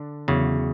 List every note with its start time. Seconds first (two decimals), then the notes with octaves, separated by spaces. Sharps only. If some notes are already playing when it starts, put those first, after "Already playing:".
Already playing: D3 D4
0.28 E2 C#3 F#3